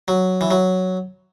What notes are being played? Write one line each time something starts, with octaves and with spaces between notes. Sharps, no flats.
F#3
E3
F#3